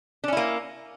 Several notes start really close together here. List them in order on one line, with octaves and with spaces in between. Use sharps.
D4 C#4 E4 A#3